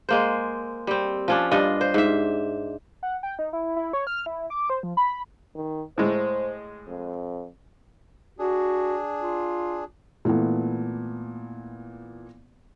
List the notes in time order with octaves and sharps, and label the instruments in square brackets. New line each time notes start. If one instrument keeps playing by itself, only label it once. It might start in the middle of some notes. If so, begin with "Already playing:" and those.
[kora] G#3 A#3 C5
G3 C4
F3 C#4 D4
G2 D4 F4 D#5
C5
G#2 E5
[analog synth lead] F#5
G5
D#4
E4
E4
C#5
F6
E4
D6
C5
F3
B5
[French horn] D#3
[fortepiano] A2 G#3 [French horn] C5
[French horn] F2
[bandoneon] D4 G#4 [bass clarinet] F#4
[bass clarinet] F4
[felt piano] A#2 E3 A3 B3